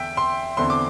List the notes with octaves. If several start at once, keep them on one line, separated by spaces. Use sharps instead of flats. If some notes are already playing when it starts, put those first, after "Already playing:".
Already playing: E2 D3 E5 G5
C6
E2 D3 C4 E4 C6
D6